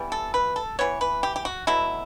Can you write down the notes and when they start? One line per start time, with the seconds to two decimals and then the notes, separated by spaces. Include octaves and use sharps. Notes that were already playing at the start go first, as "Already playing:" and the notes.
Already playing: E3 G3 B3
0.12 A4
0.34 B4
0.56 A4
0.79 E3 B3 C#5
1.01 B4
1.23 G4
1.36 G4
1.45 F#4
1.67 B2 F#3 A3 E4